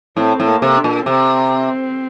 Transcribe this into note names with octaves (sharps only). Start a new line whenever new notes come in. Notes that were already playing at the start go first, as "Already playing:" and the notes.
A2 C4
A2
A#3
C3
D4
A#2
C3 C4